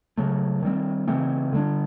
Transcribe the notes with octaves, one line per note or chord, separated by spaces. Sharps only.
C#3 F#3 A3
D#3 G3 C4
C#3 E3 A3 C4
D3 G3 A#3 D4